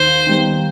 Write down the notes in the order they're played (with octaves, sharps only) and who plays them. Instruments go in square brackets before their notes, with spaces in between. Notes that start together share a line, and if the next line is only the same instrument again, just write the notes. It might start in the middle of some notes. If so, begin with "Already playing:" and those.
Already playing: [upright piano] D#2 [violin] C5
[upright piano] D#3 G3 B3 D#4